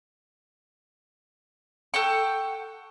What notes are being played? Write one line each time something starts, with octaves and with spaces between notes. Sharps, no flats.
A4 F#5 G5 C#6